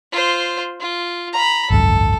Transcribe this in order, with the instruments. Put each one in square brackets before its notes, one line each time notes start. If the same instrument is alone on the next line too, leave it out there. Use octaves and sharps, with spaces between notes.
[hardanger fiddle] F4 C5
F4
A#5 B5
[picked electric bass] G#1 C#2 F#2 [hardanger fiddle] A4